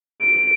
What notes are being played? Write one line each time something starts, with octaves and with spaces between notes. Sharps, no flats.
D7